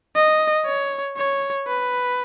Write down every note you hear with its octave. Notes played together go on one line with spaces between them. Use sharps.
D#5
C#5
C#5
B4